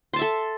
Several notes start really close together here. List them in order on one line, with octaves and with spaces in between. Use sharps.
C6 A5 E5 A4